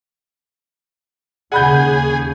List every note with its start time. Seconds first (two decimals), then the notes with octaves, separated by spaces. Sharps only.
1.52 D#2 C#3 G#4 F#5 B5 G6